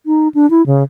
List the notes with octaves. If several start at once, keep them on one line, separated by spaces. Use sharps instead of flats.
D#4
D4
E4
C#3